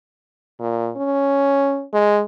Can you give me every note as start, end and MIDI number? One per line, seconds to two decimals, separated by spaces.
0.60 0.91 46
0.96 1.85 61
1.94 2.22 56